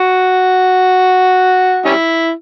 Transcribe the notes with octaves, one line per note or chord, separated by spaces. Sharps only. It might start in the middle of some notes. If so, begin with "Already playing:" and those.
Already playing: F#4
G3 C#4 E4